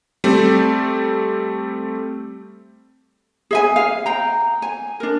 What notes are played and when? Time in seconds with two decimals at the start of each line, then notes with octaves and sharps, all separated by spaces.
0.24 G3 A3 C4
3.51 G#4 E5 G#5
3.76 F5
4.06 G5 A#5
4.62 G#5
5.00 D4 A#4